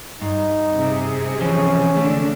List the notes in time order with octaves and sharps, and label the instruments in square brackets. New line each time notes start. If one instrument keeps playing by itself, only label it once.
[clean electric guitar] G2 [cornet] D#4
[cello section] C3 G#4
[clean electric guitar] E3 F3 [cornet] C#4
[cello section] D3 D4 [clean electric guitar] A3